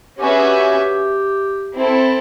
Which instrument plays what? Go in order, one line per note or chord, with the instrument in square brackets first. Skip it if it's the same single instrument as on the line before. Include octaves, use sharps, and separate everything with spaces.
[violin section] C#4 F#4 B4 E5 G#5 [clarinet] G4
[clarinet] G#4
G4
[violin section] C4 E4 A4